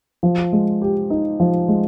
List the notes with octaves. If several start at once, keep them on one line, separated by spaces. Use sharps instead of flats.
F3
G#3
G4
D#4
F3
G#3